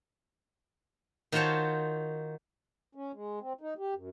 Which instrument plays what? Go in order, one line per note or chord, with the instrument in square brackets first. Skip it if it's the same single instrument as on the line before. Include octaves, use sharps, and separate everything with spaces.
[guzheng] D#3 F4 F#4 C5 C#5 A5
[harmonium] C#4
G#3
C4
D#4
G4
F#2